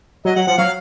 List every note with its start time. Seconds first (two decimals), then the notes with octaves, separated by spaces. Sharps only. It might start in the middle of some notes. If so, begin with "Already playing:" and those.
0.25 F#3 D#5
0.36 F#3 F#5
0.47 F3 F#5
0.58 F#3 F5